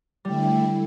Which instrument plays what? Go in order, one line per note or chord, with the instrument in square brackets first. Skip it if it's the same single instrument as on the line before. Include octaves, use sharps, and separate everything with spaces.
[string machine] D3 A3 E4 [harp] G3